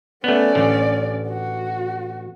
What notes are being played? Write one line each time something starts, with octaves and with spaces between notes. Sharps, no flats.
A3 B3 C#4 D5
A1 D3
F#4